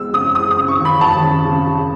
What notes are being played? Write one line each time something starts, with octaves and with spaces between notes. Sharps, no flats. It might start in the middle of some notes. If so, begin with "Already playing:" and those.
Already playing: G#3 B3 E6
C#3 D#6
G#3 D#6
D#6
C#3
C#6
D#2
B5
D#2 A5
C#3
C#3
C#3